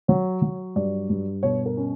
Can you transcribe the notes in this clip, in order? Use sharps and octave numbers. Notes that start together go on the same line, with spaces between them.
F#3 C#5
F#3
G2 D5
G2
B2 C#5
A#4
C#4